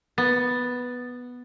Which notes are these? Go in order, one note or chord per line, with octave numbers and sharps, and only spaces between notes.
B3 A6